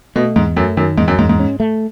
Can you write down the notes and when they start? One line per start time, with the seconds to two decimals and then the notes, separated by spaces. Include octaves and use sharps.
0.16 B2 A3
0.36 E2 G#2
0.56 F#2 A3
0.77 F#2 D#3
0.98 E2 G#2
1.08 F#2
1.18 E2 G#2
1.29 G#2
1.39 C#4
1.60 A3